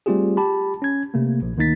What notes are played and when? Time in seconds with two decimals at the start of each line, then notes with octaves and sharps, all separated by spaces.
0.06 G3 A3 C4 F4 G4 G#4
0.37 G4 A5 B5
0.82 C#4 G#6
1.14 C3 A3 A#3
1.42 A#1
1.57 D2 D#3 A#3 D#4 A6 B6